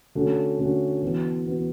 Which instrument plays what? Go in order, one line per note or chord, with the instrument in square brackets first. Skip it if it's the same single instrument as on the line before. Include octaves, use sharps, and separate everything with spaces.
[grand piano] D3 A3 C#4 F#4
D3 A3 C#4 F#4
E3 B3 F#4 B4
E3 B3 F#4 B4